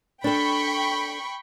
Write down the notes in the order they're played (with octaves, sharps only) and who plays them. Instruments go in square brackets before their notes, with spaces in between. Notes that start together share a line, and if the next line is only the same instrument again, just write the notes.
[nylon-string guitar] D4 A4 [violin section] G5 B5 C#6